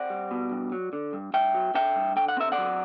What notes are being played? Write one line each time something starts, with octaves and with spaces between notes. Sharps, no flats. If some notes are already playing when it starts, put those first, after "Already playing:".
Already playing: C4 D5 F#5
G3
B2
G2
F#3
D3
G2
G2 E5 G5
F#3
D3 E5 G5
G2
D3 G5
F#5
C4 E5
D5 F#5
F#3